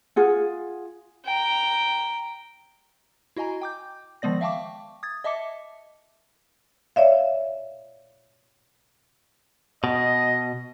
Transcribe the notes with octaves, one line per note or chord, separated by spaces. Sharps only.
F4 G#4 F#5
G5 A#5
E4 F#4 D#5 G#5 A#5
G5 D6 G6
D#3 F3 G#3 B3 D5 A#6
E5 F5 G5 A5 C#6 D6
D#6 G#6 A6
D#5 E5 A5 D6 C#7
C#5 D5 E5 F5
B2 D#5